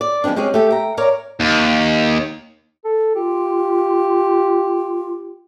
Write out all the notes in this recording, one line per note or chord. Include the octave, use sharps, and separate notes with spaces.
D5
F3 G#3 B3 C4 D4
G#3 C4 C#4 G4 G#4
A3 G4 A4
G5 A#5
A#4 C#5 D5 A#5
D#2
A4
F4 G4